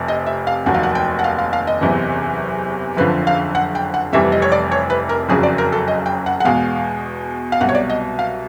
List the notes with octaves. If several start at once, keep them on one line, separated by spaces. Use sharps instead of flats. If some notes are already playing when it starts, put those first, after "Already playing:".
Already playing: F1 F2 C3
D#5
E5
F5
F1 D#2 D#3 F#3 F#5
F5
F#5
G5
F#5
F5
F5
F5
D#5
F#1 E2 C3 E3
F#1 F2 D3 F3 B4
F5
F#5
G5
F#5
F1 F2 C3 E3 G3 E5
D#5
C#5
D5
C#5
B4
A#4
F#1 F2 C#3 F#3 G#4
D5
A#4
A4
D#5
G5
F#5
F#5
E2 B2 G#3 F5
F5
C2 B2 F#3 F#5
C#5
D5
D#5
F5